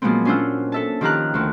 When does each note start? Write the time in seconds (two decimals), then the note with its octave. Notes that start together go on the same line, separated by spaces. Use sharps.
0.02 A#2 F3 F#3 G#3 B3 C4
0.25 C#4 D4 F4 C5 F#5 E6
0.72 A4 E5 A5
1.01 D#3 F3 G4 F5 A#5 F#6
1.34 D2 D#3